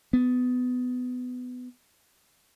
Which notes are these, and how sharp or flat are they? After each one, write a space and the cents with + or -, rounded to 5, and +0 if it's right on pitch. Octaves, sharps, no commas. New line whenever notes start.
B3 +20